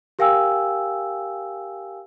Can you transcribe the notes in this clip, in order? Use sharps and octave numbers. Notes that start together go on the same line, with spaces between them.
G4 A#4 F5 G5 G#5 E6